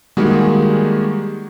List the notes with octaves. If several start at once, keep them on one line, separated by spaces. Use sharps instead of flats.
D#3 G3 G#3 A#3 F#4 G#4